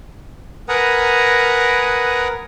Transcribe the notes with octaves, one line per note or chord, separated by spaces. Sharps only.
A#4 B4 F#5 G#5 A#5 D#6